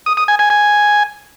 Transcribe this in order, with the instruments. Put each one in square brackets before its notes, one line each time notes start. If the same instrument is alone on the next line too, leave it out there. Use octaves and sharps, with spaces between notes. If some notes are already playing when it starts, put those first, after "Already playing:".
[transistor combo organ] D#6
D#6
G#5
G#5
G#5